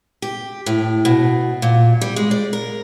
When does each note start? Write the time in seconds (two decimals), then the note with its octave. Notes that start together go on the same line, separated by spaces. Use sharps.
0.22 G4
0.66 A2
1.05 B2
1.62 A#2
2.01 G3
2.16 G#3
2.31 D5
2.53 A#4